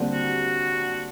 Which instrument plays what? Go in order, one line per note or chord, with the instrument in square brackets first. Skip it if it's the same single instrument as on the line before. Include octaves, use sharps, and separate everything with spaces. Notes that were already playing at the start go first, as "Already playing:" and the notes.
Already playing: [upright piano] D#2 D3 G3 C4
[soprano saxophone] F#4